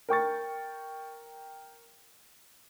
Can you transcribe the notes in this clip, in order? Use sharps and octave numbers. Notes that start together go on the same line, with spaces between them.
A#4 G5 C#6 A6